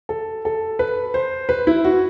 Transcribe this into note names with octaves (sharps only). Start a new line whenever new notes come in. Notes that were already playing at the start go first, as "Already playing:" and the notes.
A4
A4
B4
C5
B4
E4
F#4